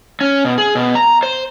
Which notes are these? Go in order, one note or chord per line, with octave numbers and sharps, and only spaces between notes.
C#4
B2
G#4
B2
A#5
C5